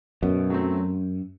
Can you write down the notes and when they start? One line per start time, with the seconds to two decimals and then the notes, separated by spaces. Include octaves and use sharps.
0.22 F#2 B2
0.50 F#3 A3 C4